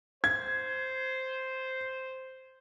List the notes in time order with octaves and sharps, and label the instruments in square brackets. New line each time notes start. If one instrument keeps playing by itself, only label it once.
[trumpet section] C5 [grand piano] G#6